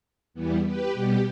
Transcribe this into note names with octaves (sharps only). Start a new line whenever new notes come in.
E2 E3 G3 B3
G4 B4
B2 G3 B3 G4